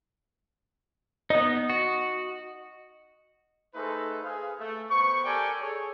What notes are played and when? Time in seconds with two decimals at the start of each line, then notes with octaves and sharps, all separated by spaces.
1.30 B3 D#4 D#5
1.70 F#4
3.75 A3 D#4 G#4 A4 B4 C5
4.23 G#4 B4 F5
4.60 A3
4.91 B3 C5 B5 C#6
5.25 G4 A4 A#4 D5 G5 G#5
5.62 G#4 A4 C#5